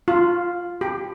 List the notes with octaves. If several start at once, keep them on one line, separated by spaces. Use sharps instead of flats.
F4
G4